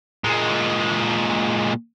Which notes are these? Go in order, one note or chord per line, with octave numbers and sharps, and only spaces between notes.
A#2 G#3